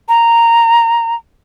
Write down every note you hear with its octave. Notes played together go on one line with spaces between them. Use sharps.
A#5